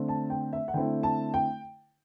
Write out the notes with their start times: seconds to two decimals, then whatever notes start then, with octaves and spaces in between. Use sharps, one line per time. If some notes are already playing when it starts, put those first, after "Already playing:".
Already playing: D3 A3 C4
0.09 A5
0.30 G5
0.53 E5
0.68 F#5
0.74 D3 A3 C4 E4 G5
1.03 A5
1.34 G5